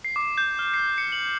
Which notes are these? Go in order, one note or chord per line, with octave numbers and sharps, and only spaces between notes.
C7
D6
G6
F6
C7
C#7
F#7